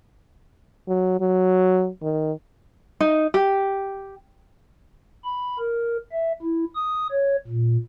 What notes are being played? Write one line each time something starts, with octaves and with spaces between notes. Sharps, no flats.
F#3
F#3
D#3
D#4
G4
B5
A#4
E5
E4
D#6
C#5
A#2